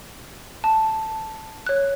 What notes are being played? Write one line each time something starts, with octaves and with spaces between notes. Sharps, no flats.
A5
C#5 F#6